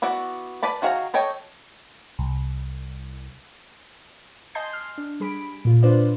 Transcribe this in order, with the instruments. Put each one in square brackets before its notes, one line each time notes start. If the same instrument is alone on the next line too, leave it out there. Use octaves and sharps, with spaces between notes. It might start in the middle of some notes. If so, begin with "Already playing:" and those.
[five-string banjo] B3 E4 F#4 D5
B4 D5 A5 B5
D#3 F#4 G#4 F5 A#5
A4 C#5 D#5 G5
[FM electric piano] C2
[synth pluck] D#5 G#5 A5 C6 G6 C7
F6
D4
G3 G#4 B5 D7
A#2 F4
D4 F4 B4 C5 D5